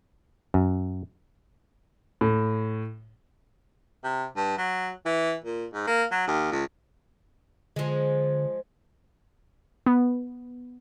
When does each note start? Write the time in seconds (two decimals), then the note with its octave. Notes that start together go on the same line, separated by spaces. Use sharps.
0.54 F#2
2.21 A2
4.04 C3
4.36 G2
4.58 F#3
5.06 E3
5.45 A#2
5.74 G#2
5.87 A#3
6.12 F#3
6.28 D#2
6.52 C#2
7.76 D3 F3 G#3
9.86 B3